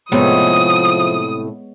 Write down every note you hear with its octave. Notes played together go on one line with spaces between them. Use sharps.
A2 C3 F3 G#3 A3 B3 C#5 D#6